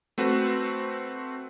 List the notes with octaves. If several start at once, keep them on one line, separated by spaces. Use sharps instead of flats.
A3 C4 F#4 B4